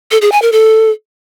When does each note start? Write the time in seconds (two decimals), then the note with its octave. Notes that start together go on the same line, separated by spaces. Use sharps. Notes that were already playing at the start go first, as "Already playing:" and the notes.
0.11 A4
0.22 G#4
0.32 G#5
0.42 A#4
0.52 A4